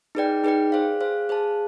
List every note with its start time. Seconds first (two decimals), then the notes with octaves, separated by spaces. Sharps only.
0.15 D#4 G#4 B4 D5 G5
0.44 D#4 G#4 B4 D5 G5
0.72 G#4 C5 F5
1.01 G#4 C5 F5
1.29 G#4 C5 F5 A5